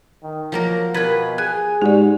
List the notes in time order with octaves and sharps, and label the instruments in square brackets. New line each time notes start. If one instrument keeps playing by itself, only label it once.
[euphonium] D#3
[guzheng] F3 A#3 A#4 [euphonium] F#3
[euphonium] B2 [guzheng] F4 G4 B4 [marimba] A#4 G#6
[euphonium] G#4 [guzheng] G#5 [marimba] F#6 G#6
[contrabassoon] G#2 [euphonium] F#4 [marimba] G4 D5